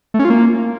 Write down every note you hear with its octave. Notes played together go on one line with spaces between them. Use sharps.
A3
C#4
F4
A#3